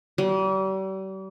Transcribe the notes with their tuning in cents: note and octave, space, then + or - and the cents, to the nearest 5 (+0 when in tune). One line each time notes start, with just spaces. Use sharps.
G3 -40